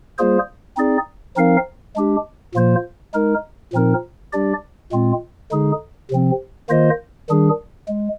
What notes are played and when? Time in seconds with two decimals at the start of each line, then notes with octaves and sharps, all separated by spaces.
0.18 G3 A#3 F4 G#4 C5
0.77 C4 D#4 G#4 D5
1.36 F3 C4 D#4 A#4 F5
1.96 G#3 D4 G4
2.54 A#2 F3 A#3 F4 C5
3.14 G#3 D#4 A#4
3.73 A#2 F3 C4 D#4 A#4
4.33 G3 D4 G4 D5
4.92 A#2 G#3 C4 F4
5.51 D3 G#3 D#4 G#4
6.10 C3 F3 C4
6.69 D#3 A#3 F4 C5 D#5
7.29 D#3 G3 D4 G#4
7.88 G#3